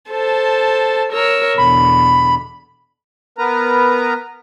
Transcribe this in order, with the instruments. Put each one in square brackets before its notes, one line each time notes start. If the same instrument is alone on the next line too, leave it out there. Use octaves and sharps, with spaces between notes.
[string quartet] A4 C5 A5
A#4 C#5 E6
[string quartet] E2 B2 D3 [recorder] B5
[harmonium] B3 A#4 B4 A#5